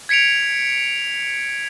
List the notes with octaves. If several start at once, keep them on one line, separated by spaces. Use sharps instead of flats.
G#6 B6 C#7 D7 F7